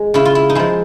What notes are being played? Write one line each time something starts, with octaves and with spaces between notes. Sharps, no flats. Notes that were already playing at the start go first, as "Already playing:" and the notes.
Already playing: G#3
C#3 E4
F4
E4
D#4
F3 G#3 E4